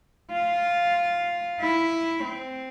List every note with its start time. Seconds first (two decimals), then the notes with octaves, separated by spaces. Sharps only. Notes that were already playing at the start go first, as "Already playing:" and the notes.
0.32 F4
1.61 E4
2.24 C4